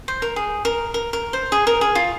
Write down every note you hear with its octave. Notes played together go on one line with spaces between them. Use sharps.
C5
A#4
G#4
A#4
A#4
A#4
C5
G#4
A#4
G#4
F4